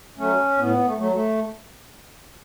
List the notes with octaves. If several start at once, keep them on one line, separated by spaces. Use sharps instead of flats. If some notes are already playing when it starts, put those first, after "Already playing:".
F#3 A3 C#4
A2 B3
A3
F#3 A3
A3